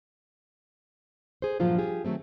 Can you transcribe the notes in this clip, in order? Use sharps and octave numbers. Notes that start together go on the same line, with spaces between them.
G#4 C5
G2 A#2 F3 F#3 F4 C5
F4 G4 G#4
D#3 E3 F#3 A3 C4